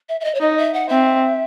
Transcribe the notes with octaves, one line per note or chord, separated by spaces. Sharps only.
E5
E5
D#5
C#5
D#4 D#5
E5
F#5
C4 E5